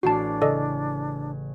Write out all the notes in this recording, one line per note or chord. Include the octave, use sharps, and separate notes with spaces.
A1 D4 F#4 A5 D6 C7
C#3 A4 D5 D#5